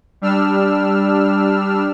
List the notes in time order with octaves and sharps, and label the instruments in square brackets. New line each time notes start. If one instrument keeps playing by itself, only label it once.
[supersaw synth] G3 D4 E6 F6